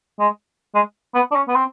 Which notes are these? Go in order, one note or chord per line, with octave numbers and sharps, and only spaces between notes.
G#3
G#3
B3
D4
C#4
B3
C4